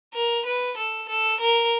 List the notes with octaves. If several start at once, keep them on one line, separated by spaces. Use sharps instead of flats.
A#4
B4
A4
A4
A#4